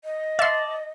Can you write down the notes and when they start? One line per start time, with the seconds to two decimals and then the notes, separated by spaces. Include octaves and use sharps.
0.04 D#5
0.39 D5 E5 A5 C6